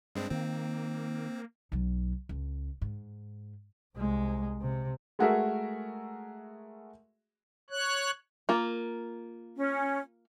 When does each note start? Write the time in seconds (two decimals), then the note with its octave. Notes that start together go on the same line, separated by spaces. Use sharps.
0.15 G2 G#3 C4 D4
0.31 D#3 A#3 C4
1.72 B1 F#3
2.29 C#2
2.81 G#2
3.96 C2 G#3
4.61 C3
5.19 G#3 A3 F#4 G#4 A#4 E5
7.70 C#5 F#6
8.49 A#3 F4
9.56 C#4